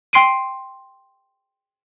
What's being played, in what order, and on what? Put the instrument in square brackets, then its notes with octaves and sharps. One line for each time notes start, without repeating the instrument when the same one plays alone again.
[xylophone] G5 C6 C7 D7 D#7